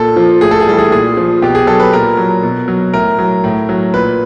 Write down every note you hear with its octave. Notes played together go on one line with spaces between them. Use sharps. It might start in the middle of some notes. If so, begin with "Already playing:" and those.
Already playing: A#2 A4
F3
A2 G#4
A4
G#4
E3 G3 A4
G#4
A#2 G#4
F3
B2 G4
G#4
F#3 A4
B4
A#2 A#4
F#3
B2
F#3
A2 A#4
F#3
A2
F#3
A#2 B4